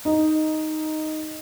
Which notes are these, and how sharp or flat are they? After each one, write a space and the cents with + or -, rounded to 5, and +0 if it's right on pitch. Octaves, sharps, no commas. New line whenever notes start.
D#4 +0